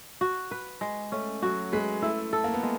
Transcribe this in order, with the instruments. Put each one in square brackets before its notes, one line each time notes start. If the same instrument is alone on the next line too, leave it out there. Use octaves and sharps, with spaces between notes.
[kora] F#4
B4
G#3
[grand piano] A3 [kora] C#4
[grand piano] F#3 [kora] F#4
[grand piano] G#3 [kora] B4
[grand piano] A3 [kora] E4
[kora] A4
[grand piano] A#3
B3
[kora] G#3